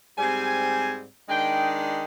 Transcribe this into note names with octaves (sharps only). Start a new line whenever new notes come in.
G#2 G3 C4 G#5
D#3 G#3 D4 G5